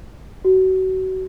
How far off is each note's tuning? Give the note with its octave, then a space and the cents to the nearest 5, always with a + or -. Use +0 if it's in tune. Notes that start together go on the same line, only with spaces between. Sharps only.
F#4 +25